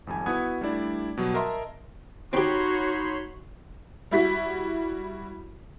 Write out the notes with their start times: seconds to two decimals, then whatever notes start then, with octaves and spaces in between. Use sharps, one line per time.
0.07 G#1 F2 G3 G#5
0.26 B3 E4 F#4 F#5 D#6 G#6
0.61 G3 A3 D4 E4 D5
1.17 B2 F#3 G3
1.34 A#4 D#5 E5 A5 A#5 C6
2.33 C4 D#4 F#4 G4 C#5 B5 C6
4.11 G3 E4 F#4 B6